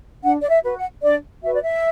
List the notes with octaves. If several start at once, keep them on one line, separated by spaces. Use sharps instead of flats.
D4 F#5
D5
E5
F#4 B4
F#5
D4 D5
F#4 B4 E5
D5
E5